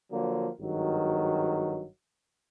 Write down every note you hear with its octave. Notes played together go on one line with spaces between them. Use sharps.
D3 F3 F#3 A#3
G#1 G2 D#3 F#3